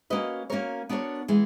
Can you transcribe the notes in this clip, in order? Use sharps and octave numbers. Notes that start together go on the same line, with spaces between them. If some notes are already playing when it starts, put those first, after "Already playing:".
A#3 C#4 F#4 B4 D#5
A#3 C#4 F#4 A#4 C#5
B3 D4 F#4 A#4 C#5
E3 G#3 B3